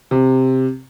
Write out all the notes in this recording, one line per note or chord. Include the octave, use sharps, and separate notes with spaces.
C3